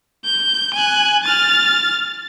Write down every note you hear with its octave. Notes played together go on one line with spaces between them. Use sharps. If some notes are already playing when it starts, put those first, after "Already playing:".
G6
G#5 F#6
F6 A6